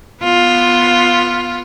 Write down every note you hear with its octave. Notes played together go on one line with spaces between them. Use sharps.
B3 F4